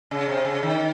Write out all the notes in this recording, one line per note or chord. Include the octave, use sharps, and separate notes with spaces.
C#3
C3
C#3
D#3